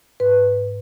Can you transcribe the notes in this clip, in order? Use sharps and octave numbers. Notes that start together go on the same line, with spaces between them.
G#2 B4